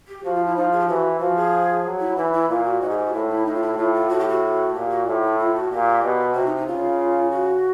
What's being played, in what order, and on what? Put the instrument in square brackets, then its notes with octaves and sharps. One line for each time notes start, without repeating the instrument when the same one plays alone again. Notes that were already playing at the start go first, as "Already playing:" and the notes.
[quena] G4
[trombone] F3 [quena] F#4
[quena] F4
E4
[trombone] F3 [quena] D#4
[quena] G#4
G4
[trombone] E3 [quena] F#4
[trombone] F3 [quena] F#4
[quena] G#4
[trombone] F#3
[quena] E4
[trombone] E3 [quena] E4
[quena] E4
[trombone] A#2 [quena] F4
[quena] F#4
[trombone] G#2 [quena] F#4
[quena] G#4
G4
F#4
[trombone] A2 [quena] E4
[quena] E4
[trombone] A2 [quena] D#4
[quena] F4
E4
F#4
[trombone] A2 [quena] F4
[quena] F4
[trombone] A2 [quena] F#4
[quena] G4
F#4
[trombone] A#2 [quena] G4
[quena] F#4
[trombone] A2 [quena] F4
[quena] E4
F4
F#4
[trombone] A#2 [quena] G4
[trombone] B2
[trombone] C3 [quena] F#4
[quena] D#4
D#4
[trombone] C#3 [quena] F4
[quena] F#4